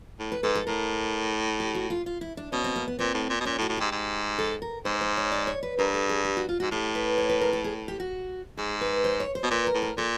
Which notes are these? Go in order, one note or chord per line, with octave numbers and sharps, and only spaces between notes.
A2
B4
G#2 A4
A4
A2 A#4
G4
F#4
F4
F4
E4
D4
B2 C#4
C4
A#3
B3
A#2 C4
A2
A#2
B2
A#2 C#4
A2
F#4
A2
G#2 G4
G#2
A4
A#4
G#2 C5
C5
C#5
D5
C#5
B4
G2 A#4
A4
G#4
G4
F#4
F4
G#2 F#4
A2 G4
B4
C#5
B4
A#4
A4
G#4
G4
F#4
G#2 G#4
B4
C5
C#5
C5
B2
A#2 B4
A#4
A2
A#4
A#2 A4